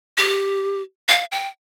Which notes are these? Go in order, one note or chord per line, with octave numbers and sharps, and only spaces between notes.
G4
F5
G5